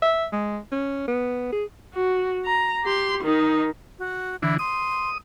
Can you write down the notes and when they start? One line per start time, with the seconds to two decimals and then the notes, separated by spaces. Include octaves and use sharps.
0.02 E5
0.32 G#3
0.72 C#4
1.08 B3
1.52 G#4
1.94 F#4
2.45 A#5
2.84 G4 C6
3.24 D#3 D#4
3.99 F#4
4.42 D3 E3 E4
4.59 C6 D#6